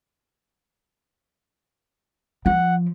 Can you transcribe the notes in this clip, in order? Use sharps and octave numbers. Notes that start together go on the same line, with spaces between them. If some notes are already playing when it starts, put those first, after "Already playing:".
F3 F#5